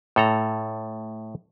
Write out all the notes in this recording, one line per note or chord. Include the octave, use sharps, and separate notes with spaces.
A2 A4 A#5